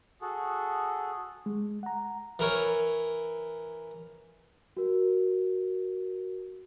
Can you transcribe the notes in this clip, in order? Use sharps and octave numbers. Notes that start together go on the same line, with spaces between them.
F#4 G#4 A4
G#3
F#5 A#5
E3 A#4 C#5
F#4 A#4